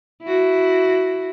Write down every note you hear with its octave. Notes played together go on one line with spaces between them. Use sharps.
E4 F#4